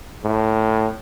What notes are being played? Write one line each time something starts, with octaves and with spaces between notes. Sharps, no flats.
A2